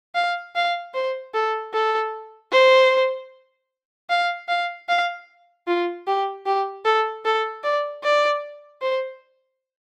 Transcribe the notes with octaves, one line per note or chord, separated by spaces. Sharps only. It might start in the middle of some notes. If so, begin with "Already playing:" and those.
F5
F5
C5
A4
A4
C5
F5
F5
F5
F4
G4
G4
A4
A4
D5
D5
C5